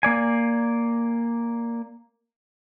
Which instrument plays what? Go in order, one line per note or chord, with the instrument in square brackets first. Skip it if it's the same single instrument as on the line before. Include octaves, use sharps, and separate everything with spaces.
[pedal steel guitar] A#3 D5 G#5